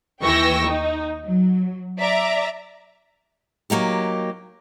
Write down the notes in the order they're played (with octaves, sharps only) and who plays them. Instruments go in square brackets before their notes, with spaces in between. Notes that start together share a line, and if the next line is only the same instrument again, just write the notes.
[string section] D#2 E3 G5 C#6 E6 A#6
D#4
F#3
D5 E5 A#5 D6
[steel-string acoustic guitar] F#3 A#3 D#4 G4